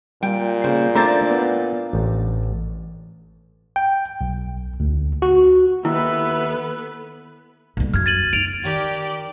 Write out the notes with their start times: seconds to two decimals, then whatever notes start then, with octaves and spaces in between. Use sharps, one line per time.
0.23 A#2 G3 G5
0.64 C#3 A#3 C5
0.95 A3 D4 E4 C5 E5 A#5 A6
1.31 B3
1.93 A1
3.76 G5
4.21 B1
4.80 D2
5.22 F#4
5.85 D#2 B3 E4 A4 B4 E5
7.77 B1 G3
7.94 F#2 F6 G#6
8.06 A6 D#7 F#7
8.33 D#3 D7 F7
8.65 D#3 G4 D5